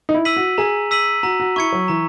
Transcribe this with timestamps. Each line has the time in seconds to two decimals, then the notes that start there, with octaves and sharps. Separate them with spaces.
0.09 D#4
0.14 E4
0.25 E6 B6 D#7 F#7
0.36 F#4
0.58 G#4 A#5
0.91 E6 B6 D#7 F#7
1.23 F#4 A#5
1.40 F#4
1.56 E4 C#6 G#6 C#7
1.72 F#3
1.88 E3 A#5